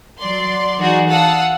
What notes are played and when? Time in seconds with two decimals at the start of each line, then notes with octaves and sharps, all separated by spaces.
0.18 F#3 D5 C6
0.78 E3 D#4 F#4 G#4 D5
1.09 F5 F#5 A5 D#6 E6